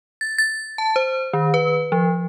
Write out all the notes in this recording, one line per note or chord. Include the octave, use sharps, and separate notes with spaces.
A6
A6
A5
C5
D#3
B4
F3